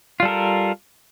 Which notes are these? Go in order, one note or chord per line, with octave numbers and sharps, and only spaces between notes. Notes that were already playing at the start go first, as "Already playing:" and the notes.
G3 F4 A4 A#4